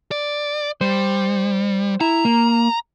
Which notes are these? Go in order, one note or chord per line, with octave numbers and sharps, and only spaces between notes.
D5
G3 C5
E4 A#5
A#3